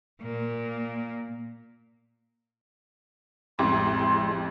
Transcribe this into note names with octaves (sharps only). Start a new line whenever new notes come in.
A#2 A#3
A1 F2 G#3 E4 G4 C6